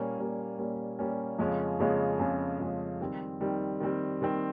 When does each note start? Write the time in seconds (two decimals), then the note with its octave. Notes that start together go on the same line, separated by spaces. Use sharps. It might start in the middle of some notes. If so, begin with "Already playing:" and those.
Already playing: A#2 G3 A#3 C#4
0.17 A#2 G3 A#3 C#4
0.58 A#2 G3 A#3 C#4
0.99 A#2 G3 A#3 C#4
1.38 F2 C#3 F3 G#3 C#4
1.79 F2 C#3 F3 G#3 C#4
2.19 F2 C#3 F3 G#3 C#4
2.59 F2 C#3 F3 G#3 C#4
3.01 D#3 G3 C4
3.41 D#3 G3 C4
3.80 D#3 G3 C4
4.22 D#3 G3 C4